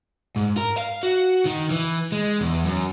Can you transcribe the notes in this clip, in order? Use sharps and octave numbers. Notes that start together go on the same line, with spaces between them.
G#2
A#4
F5
F#4
D#3
E3
G#3
E2
F#2